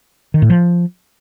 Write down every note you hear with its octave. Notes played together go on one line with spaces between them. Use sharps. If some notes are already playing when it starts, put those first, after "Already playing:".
D#3
A2
F3